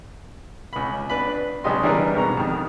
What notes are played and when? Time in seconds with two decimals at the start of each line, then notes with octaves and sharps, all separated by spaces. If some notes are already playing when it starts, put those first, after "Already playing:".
0.73 C#2 B5
1.10 D4 B4 B5
1.64 C#2 F#3 D4 G4 D#5 C6
1.83 E3 G3 D4 G#4 A#4 B4
2.15 G#2 B2 A#5
2.37 F2 D#3